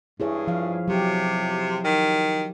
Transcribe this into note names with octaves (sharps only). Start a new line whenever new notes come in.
G2 E4 G#4 C#5
F3 F5
C3 F#3 G4
D#3